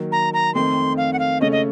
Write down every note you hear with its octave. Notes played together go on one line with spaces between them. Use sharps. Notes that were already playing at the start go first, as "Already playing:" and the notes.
Already playing: D#3 F#3 A#3
A#5
A#5
F2 D#3 A3 C4 C6
F5
F#5
F5
C#3 A3 C#4 A4 D#5
D#5